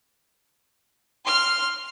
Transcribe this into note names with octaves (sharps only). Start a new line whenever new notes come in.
C6 F6